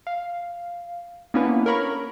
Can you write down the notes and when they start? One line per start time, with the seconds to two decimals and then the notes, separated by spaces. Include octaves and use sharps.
0.07 F5
1.34 A#3 B3 C#4 D4 E4 B4
1.66 A#4 C#5 B5 C#6